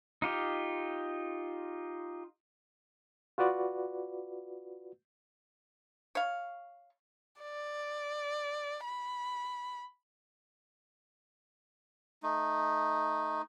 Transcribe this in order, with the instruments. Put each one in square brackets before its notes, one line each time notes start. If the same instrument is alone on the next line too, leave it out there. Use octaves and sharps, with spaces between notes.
[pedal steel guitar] D#4 F4 G4
[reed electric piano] F4 F#4 B4 D5
[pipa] C#5 F5
[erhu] D5
B5
[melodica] A3 D#4